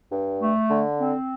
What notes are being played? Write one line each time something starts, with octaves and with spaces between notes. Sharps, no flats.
G2
A3
D3
C4